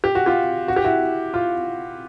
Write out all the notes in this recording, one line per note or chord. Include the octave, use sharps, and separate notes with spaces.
G4
F#4
F4 G4
F#4
G4
E4 F#4
F4